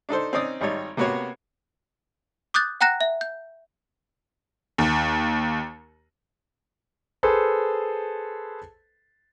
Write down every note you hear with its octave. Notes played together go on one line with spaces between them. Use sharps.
D4 D#4 A4 C5
C4 C#4 D#4 D5 D#6
G#1 G3 D#4 C#5
C3 A#3 B3 F#4 C#5
D6 D#6 F#6 G6 A6
F#5 G5 A#5 F#6 A#6 E7
E5
G6
D#2
G#4 A4 B4 C5